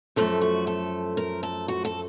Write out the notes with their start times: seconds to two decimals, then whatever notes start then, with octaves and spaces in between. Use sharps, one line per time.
0.16 F#2 F3 A3 A4
0.41 F#4
0.67 A4
1.17 A#4
1.43 A4
1.68 F#4
1.85 A4